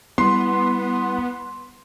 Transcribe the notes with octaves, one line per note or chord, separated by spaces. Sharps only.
G3 B3 E4 C6